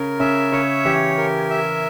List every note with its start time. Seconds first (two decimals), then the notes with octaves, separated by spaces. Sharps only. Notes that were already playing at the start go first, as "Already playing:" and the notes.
Already playing: C#3 C#4 A#4
0.19 C#3 C#4 E5
0.52 C#3 C#4 C#5
0.85 E3 E4 G4
1.18 A#4
1.50 E5